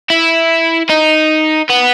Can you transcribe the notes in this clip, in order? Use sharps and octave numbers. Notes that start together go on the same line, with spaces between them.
E4
D#4
B3